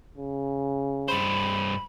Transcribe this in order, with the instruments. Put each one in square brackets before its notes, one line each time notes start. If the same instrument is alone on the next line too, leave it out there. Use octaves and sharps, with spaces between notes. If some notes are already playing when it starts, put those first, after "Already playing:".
[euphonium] C#3
[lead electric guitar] G2 C5 [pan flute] B5